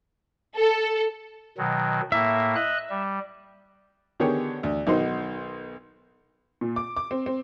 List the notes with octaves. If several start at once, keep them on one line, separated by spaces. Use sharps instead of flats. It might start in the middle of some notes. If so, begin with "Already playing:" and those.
A4
B2 D#3 F#3
A2 A#3 E5
D#5 F#6
G3
D3 D#3 B3 G4 G#4 C#5
D2
B1 D#3 D#4 F#4 C5
A#2
D6
D6
C4
C4